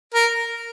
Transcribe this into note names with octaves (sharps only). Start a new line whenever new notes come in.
A#4